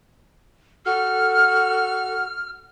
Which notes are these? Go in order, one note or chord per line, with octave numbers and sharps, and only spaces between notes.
F#4 A4 F6